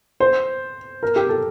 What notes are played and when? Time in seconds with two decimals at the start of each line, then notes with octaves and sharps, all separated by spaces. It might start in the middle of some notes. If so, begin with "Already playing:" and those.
0.20 C5
1.03 A#4
1.16 G4
1.29 A4